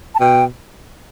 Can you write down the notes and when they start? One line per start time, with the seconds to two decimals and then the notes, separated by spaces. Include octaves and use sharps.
0.15 A5
0.20 B2 G5